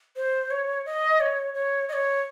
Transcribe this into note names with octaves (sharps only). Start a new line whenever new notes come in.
C5
C#5
D#5
C#5
C#5
D#5
C#5